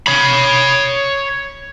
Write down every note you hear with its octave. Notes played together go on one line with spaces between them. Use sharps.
C#5 B5